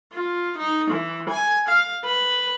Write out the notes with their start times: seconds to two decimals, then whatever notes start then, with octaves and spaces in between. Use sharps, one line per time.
0.13 F4
0.58 D#4
0.90 E3
1.29 G#5
1.68 F5
2.04 B4